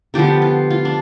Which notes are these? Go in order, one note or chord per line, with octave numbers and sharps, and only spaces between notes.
D3 F3 B3 G4
F4
F4
D4